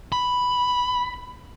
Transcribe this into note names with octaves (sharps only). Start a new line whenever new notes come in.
B5